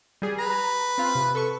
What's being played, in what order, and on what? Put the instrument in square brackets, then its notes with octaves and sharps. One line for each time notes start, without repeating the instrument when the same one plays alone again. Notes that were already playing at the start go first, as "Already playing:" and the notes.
[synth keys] G3 G#4
[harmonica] B4 [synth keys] A#5
[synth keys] C4 F4
C3
A4 B4 C#6